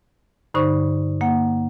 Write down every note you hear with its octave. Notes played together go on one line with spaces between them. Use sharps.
G2 D3 D#4 C5 C#6
A#3 F#5